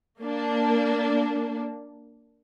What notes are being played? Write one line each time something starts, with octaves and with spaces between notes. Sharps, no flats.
A#3 D4